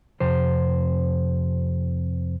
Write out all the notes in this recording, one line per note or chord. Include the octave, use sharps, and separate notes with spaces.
F2 C3 C5